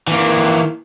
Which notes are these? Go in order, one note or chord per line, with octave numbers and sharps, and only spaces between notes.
E3 A#3